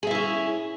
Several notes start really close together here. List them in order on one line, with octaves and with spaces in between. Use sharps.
G#4 E5 E4 C#4